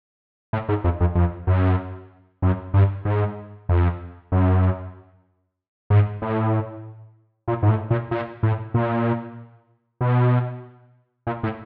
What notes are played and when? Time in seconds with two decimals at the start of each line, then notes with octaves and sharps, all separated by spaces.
0.53 A2
0.69 G#2
0.84 F2
1.00 F2
1.15 F2
1.47 F#2
2.42 F#2
2.74 G2
3.05 G#2
3.69 F2
4.32 F#2
5.90 G#2
6.22 A2
7.48 A#2
7.63 G#2
7.69 A2
7.90 A#2
8.11 A#2
8.43 A2
8.74 A#2
10.01 B2
11.27 A#2
11.43 A2